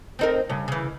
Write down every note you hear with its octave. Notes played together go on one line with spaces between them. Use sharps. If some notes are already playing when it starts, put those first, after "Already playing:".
C4 D#4 A#4
G2 C#3 C#4
C#3 E3